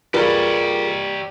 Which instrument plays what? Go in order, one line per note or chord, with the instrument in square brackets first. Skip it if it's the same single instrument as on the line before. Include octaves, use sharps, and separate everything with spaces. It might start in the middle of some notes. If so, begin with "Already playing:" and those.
[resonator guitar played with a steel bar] G3 [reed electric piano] F4 G#4 A#4 [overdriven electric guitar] G4 C#5 [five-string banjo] B4